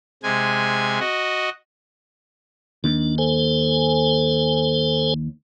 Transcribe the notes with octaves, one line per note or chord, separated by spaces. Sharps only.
C3 G#3 G#5
F#4 D#5
D#2 D4
A4 C5 G#5